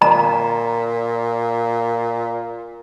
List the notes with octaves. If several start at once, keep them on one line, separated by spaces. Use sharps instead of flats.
A#2 A#5